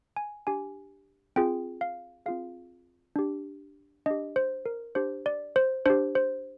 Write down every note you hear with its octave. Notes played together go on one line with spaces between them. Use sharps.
G#5
D4 G4 G#5
C4 F4 G#4 G5
F5
C4 F4 G#4 F5
D4 G4
D4 G4 D#5
C5
A#4
D4 G4 C5
D5
C5
D4 G4 C5
C5